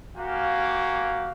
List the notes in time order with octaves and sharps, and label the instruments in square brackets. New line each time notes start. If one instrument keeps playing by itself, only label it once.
[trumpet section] A#3 F#4 G4 F5 G#5